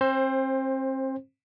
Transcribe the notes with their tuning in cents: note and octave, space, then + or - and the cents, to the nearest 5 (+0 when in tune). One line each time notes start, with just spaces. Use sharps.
C4 +35 C5 +15